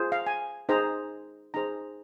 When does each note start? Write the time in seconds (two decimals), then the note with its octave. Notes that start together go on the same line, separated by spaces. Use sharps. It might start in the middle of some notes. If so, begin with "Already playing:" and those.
Already playing: F4 G#4 C5
0.12 F5
0.26 G#5
0.69 D#4 G#4 C5 A#5
1.54 D#4 G#4 C5 A#5